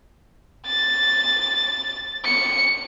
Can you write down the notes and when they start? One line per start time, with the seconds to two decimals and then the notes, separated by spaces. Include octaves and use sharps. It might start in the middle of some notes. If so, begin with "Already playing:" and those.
0.66 A6
2.24 C#7